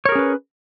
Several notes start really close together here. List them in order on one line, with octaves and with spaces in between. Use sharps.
C#5 A#4 G#4 C#4 B4